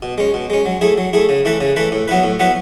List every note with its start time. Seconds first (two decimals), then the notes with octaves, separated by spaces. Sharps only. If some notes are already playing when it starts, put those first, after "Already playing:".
0.02 B2
0.18 G#3 C#4
0.34 B2
0.50 G#3 C#4
0.66 F#3
0.81 A3 E4 G#4
0.98 F#3
1.13 A3 E4 G#4
1.29 C#3
1.45 E3 A3 E4 B4
1.61 C#3
1.76 E3 A3 E4 B4
1.92 A2
2.08 F#3 B3 E4 B4
2.24 A2
2.39 F#3 B3 E4 B4